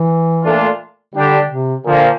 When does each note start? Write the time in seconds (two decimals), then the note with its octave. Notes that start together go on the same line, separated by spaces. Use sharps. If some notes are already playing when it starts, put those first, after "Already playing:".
Already playing: E3
0.43 A#2 A3 D4 F4
1.14 D3 G3 D4 G4
1.51 C3
1.85 A#2 D3 F3 A#3